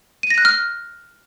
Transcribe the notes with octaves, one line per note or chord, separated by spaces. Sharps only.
D#7
A#6
F#6
F6